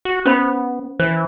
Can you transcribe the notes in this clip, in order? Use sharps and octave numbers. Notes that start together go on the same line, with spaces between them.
F#4
B3 C#4 C5 B5
E3 C5